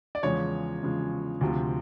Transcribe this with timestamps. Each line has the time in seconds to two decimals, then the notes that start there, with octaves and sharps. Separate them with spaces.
0.15 D5
0.23 E2 C#3 F3 G#3 C#5
0.82 E2 C#3 F3 G#3
1.41 D2 C3 F3